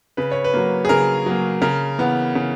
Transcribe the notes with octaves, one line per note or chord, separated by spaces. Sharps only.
C#3 B4
C#5
B4
F#3 A#3
G#4
C#3 A#4
F#3 A#3
C#3 A#4
E3 B3
C#3